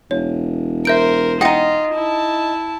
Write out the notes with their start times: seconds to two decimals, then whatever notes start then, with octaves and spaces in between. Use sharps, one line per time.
0.11 E1 C#5
0.85 A#4 C5 E5 G6 D7
1.41 D#4 F4 D#5 F#5 G5 C#7
1.94 E4 A5